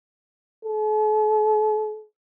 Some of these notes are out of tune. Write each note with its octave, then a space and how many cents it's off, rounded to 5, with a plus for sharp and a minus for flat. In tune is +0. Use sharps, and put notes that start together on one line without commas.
A4 -45